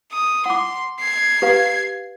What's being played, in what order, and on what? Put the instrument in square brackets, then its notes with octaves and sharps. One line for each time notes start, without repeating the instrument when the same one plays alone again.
[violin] D#6
[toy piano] F#5 D6 [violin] C6
[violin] G#6 C7
[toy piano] G4 B4 F5